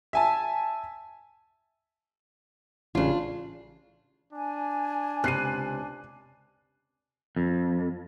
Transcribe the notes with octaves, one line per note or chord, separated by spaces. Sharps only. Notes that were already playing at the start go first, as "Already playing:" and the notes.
E5 G#5 A5
A1 C#3 D4 F4
D4 G#5
C#2 C3 F#6 C7 D#7
F2